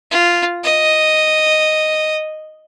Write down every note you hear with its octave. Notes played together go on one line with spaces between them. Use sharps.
F4
D#5